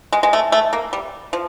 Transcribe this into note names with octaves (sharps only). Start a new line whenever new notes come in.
G#3
G#3
A3
A3
A#3
G3
F3